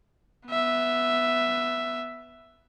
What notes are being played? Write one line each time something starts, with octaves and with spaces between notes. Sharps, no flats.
B3 E5